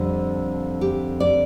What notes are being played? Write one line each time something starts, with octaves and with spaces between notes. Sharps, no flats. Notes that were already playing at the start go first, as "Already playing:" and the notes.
Already playing: F2 D3 G3
G4
D5